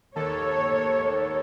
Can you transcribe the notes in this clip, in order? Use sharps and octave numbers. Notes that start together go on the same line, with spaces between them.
D#2 A4 C#5